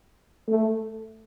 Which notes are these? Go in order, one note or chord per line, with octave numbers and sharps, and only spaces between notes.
A3